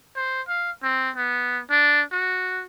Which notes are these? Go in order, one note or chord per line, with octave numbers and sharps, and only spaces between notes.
C5
F5
C4
B3
D4
F#4